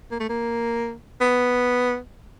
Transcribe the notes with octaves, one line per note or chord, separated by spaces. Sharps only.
A#3
A3
A#3
B3